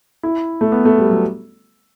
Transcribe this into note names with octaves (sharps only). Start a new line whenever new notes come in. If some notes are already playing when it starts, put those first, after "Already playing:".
E4
A3
B3
A3
G3
F#3